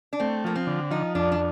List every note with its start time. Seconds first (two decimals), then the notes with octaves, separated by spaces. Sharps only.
0.13 D4
0.20 A3 C4
0.44 F3 A#3
0.55 C4
0.67 D3
0.91 F3 D#4
1.15 F2 D4
1.32 D4